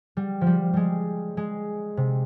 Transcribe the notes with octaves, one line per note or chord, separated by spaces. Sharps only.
G3
F3
G3
G3 G#3
G#3
C3